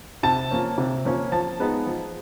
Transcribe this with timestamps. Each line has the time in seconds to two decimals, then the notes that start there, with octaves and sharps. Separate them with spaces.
0.23 C3 A5
0.51 F3 A#3 C#4
0.78 C3
1.05 F3 A#3 C#4
1.32 F3 A5
1.60 G#3 B3 D#4
1.86 F3